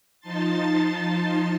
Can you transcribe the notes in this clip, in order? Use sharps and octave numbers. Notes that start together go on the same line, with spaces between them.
F3 D#4 A5 C6 A6